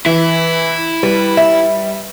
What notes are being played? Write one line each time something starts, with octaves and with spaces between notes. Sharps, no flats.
E3 E4
G3 B4
E5